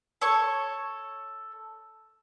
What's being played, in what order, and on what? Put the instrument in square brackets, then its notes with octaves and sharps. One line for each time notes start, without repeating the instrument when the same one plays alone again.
[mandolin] A4 C#5 C#6